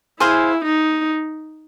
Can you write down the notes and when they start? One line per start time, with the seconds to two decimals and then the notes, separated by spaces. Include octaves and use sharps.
0.20 E4 G#4 C5 F5 G#5
0.65 D#4